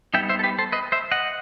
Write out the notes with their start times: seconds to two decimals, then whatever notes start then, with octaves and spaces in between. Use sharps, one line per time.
0.14 G3 B3 D#4 E5 G5
0.29 C5 E5
0.39 A4
0.44 G4 B4
0.58 A4 C5
0.72 B4 D#5
0.92 C5 E5
1.11 D#5 F#5